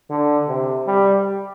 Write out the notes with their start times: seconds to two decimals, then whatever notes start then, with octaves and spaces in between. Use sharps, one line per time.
0.10 D3
0.48 C3
0.87 G3